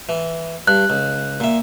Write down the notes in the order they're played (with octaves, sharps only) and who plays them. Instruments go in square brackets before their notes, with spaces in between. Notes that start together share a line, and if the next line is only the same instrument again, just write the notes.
[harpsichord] E3
[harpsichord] G2 [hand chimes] F#6
[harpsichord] C#2
A#2 E5